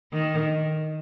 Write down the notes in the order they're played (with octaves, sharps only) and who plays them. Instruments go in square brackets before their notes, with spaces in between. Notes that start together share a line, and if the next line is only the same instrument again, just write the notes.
[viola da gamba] D#3